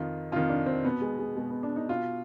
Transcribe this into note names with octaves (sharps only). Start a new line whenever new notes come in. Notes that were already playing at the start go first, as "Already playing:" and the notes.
Already playing: F2 D#3 F4
F2 D#3 F4
D4
C4
B2 B3
G#3
G#3
B2 G#3
B3
D4
D#4
B2 F4